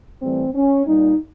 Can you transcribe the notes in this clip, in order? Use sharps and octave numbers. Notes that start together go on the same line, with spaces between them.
A2 E3 G3 C4
C#4
A#2 G3 D#4